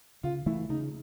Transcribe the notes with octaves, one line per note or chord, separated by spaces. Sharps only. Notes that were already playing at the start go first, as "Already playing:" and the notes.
C#3 F4
E3 A3 E4
C#3 D#4